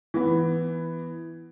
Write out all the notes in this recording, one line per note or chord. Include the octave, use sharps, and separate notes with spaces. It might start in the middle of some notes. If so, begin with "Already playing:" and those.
E3 B3